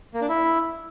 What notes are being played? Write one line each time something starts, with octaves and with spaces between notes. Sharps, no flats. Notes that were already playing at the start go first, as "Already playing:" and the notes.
A#3
D4
E4